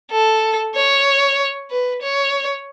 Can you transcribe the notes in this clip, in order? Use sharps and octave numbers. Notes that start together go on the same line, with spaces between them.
A4
C#5
B4
C#5